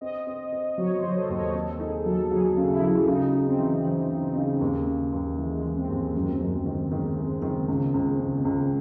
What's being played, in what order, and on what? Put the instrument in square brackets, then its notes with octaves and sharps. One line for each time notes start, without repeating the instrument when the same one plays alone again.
[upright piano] C4 [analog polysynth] D#5
[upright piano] C4
C4
[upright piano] F#3 [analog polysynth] C#5
[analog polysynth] C5
[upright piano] F#3
[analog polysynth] A4
[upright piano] D#2
[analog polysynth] C#5
[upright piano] C4 [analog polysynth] A4
[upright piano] D#4 [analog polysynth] G#4
[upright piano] F#3 [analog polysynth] A4
[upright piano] F#3 [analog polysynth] G#4
[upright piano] C#3
[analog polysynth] E4
[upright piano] F#3
[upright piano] C#3 [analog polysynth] D#4
[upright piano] C#3
[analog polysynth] C4
[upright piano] E3
E3
C#3
C#3
D#2
C#3
D#2
[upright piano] E3 [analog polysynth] G#3
[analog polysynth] G#3
[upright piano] E3
[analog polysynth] C4
[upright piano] D#2
[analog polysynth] G#3
[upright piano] F#2
F#2
D#3
D#3
G#3
D#3
C#2
C#2
C#2
C#2